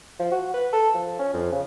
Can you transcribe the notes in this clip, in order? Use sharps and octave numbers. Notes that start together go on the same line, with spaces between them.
F3
F#4
B4
A4
F3
C#4
F2
C#3